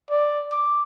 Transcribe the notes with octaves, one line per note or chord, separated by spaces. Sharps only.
D5
D6